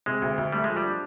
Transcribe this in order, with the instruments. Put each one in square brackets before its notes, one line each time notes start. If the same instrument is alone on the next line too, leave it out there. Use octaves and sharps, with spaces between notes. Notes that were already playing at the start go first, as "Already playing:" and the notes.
[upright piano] C3 [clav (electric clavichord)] G#3
[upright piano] D2
D2
[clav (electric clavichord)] G3 [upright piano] A3
[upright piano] F3 [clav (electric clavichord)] G#3
[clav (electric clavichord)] G3
[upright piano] D4